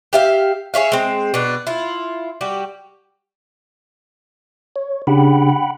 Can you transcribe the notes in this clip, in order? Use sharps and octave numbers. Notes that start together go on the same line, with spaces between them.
G4 E5 F5
G#4 C#5 E5 F5
G#3 C4
B2 D4
E4 F4
G3 F#4 G4
C#5
C#3 D4 G4 F#5 G5 B5